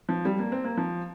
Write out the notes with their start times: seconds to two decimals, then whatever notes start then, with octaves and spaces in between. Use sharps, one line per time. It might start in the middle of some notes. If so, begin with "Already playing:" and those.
0.09 F3
0.25 G3
0.39 A#3
0.52 C4
0.64 A#3
0.77 F3